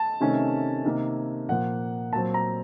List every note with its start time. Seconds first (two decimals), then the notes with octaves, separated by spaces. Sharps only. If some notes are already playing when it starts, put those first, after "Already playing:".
Already playing: A5
0.20 C3 D#3 A3 C#4
0.85 C3 D#3 A#3
1.49 A#2 F3 A#3 F#5
2.13 A#2 F#3 C4 A5
2.34 A#5